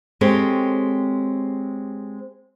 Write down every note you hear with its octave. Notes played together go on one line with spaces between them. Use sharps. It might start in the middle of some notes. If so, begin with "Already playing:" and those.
G#3 C4 G4 A4 C#5